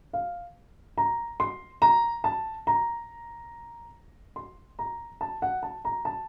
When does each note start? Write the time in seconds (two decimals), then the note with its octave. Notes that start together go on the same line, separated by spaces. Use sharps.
0.13 F5
0.98 A#5
1.40 C6
1.82 A#5
2.24 A5
2.67 A#5
4.36 C6
4.79 A#5
5.21 A5
5.42 F#5
5.63 A5
5.85 A#5
6.05 A5